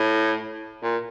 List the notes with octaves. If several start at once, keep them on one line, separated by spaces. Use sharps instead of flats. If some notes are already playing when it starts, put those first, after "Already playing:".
Already playing: A2
A#2